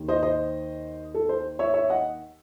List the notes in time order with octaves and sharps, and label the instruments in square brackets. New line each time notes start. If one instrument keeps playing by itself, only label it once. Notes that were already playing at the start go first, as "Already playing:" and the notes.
Already playing: [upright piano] D#2 D#3
C5 D#5
C5 D#5
A4
C5
C#5 E5
C#5 E5
D#5 F#5